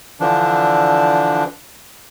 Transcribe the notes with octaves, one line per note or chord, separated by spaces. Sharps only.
D3 E3 F3 D4